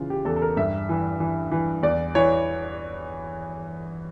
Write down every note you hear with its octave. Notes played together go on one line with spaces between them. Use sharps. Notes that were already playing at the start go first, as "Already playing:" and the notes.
Already playing: C#3 E3 F4
G4
E2 A4
A4
A#4
G2 E5
E3
E3
E3
E2 D5
E3 C#5